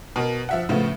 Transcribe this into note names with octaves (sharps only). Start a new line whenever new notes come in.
B2 A#4
F3 E5 F#5
A2 C#3 F3 B3